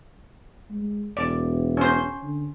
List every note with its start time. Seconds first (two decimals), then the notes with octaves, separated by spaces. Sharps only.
0.71 G#3
1.17 E1 D5
1.77 C#4 C5
2.23 D3